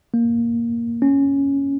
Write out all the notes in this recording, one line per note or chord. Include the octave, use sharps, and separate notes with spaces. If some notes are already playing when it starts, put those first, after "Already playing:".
A#3
C#4